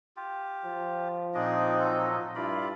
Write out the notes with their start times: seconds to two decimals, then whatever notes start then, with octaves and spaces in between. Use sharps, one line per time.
0.17 F4 G4
0.64 F3
1.35 A#2 C4 D4 D#4 G#4 D5 D#5
1.80 F#3 F4 A4
2.35 G2 E4 F4 D5 B5